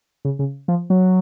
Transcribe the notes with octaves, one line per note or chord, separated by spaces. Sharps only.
C#3
C#3
F3
F#3